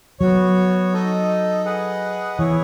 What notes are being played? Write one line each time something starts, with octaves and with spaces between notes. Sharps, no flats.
F#3 B3 F#4 C#5
D#4 A4 D#5
G#4 B4 D#5 F#5
E3 B3 E4 G#4 C#5